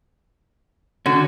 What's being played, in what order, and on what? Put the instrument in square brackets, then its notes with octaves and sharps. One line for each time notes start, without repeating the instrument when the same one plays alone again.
[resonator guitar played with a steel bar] D3 [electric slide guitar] C#4 F#4